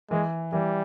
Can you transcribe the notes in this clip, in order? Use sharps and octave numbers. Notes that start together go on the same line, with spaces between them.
E3 G#3
E3 G3